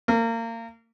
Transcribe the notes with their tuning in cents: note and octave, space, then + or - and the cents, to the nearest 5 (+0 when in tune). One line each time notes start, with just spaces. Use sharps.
A#3 -30